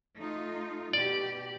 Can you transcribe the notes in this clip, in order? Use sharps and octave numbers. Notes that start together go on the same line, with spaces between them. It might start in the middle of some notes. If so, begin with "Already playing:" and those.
A3 D#4 F4
B2 G4 D5